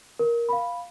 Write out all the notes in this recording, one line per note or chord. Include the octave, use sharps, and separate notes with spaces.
A#4
F5 B5